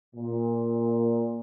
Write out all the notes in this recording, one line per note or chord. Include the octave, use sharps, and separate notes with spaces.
A#2